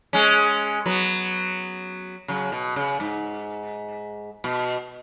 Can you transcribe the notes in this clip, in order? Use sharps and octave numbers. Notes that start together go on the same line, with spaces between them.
G#3 C#4
F#3 B3
C#3 F#3
B2
C#3
G#2
B2